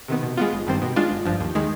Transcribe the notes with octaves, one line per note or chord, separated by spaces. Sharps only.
C3 D#3 B3
B2
G#3 B3 F4
G#1
G2 D#3 G3 C4
B2
G#3 D4 F4
G1
G2 F3
D#2
D#3 G#3